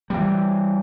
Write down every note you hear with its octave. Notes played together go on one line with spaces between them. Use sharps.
E3 G3